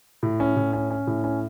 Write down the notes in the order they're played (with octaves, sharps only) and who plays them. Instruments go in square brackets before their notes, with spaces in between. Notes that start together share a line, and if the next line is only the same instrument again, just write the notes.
[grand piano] A2
C#4
A2
C#4
C#4
A2
C#4